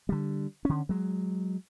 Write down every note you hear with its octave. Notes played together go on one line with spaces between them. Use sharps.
D3 G3
D3 C#4
F#3 G#3